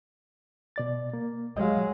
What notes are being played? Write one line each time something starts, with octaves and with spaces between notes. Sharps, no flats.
B2 D5 A6
A#3
F#3 G#3 D#5 F5